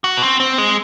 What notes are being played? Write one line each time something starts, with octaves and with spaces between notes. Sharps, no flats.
F#4
B3
C4
C4
G#3